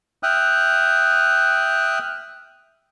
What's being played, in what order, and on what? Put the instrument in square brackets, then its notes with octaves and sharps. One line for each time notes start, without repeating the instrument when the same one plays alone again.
[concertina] E5 G5 D#6 F6 F#6